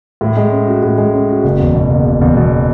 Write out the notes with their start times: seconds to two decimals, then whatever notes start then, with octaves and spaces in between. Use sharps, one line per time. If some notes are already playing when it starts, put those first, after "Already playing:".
0.21 A2
0.37 G#3
0.52 C#4
0.67 F#4
0.83 A2
0.98 G#3
1.14 C#4
1.29 F#4
1.44 F#1
1.60 E2
1.75 B2
1.90 F#1
2.06 F#1
2.21 E2
2.37 B2